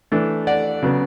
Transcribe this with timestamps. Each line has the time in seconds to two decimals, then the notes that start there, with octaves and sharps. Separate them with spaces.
0.12 E3 A3 D4
0.47 D5 F#5
0.82 C#3 F#3 B3